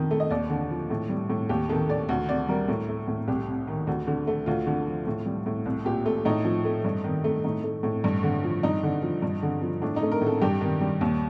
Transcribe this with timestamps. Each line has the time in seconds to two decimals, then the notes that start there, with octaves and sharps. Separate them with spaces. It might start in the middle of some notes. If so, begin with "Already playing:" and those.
Already playing: F2 D#3
0.11 A3
0.20 D#5
0.30 D#2 D5
0.50 D3
0.70 F3
0.90 A2
1.09 G3
1.30 A2
1.49 D#2 G4
1.69 D#3 A4
1.89 A3 D5
2.09 D2
2.28 C3 D5
2.48 G3 A#4
2.68 A2
2.89 A3
3.08 A2
3.28 C2 G4
3.47 C3
3.67 D#3
3.87 D2
4.07 D3
4.27 A3
4.46 D2 F4
4.66 D3
4.87 F3
5.07 A2
5.26 G3
5.46 A2
5.66 C2
5.85 A#2 G4
6.06 A3
6.25 A2 D#4
6.45 F3
6.65 A3
6.84 G2
7.04 D#3
7.24 A3
7.44 A2 D#4
7.64 A3
7.83 A2
8.04 G2
8.23 D3
8.44 F3
8.63 G2 D#4
8.83 D3
9.02 F3
9.22 G2
9.42 D3
9.62 F3
9.82 A2 D4
9.96 D#4
10.02 A3
10.12 A#4
10.21 A2
10.27 A4
10.41 G2 G4
10.61 D#3
10.81 G3
11.01 D#2